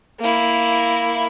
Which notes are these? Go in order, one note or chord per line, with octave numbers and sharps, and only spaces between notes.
A#3 E4